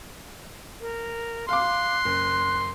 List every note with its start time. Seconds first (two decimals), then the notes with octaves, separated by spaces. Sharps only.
0.81 A#4
1.49 F5 C6 D6 F#6
2.05 F#1